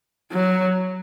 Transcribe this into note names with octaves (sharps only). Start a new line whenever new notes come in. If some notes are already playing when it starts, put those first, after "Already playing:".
F#3